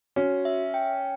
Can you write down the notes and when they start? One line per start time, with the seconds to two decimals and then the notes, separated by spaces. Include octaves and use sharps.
0.16 C#4 F#4
0.45 E5
0.74 G5